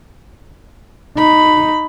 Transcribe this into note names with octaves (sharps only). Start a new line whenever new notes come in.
D#4 B5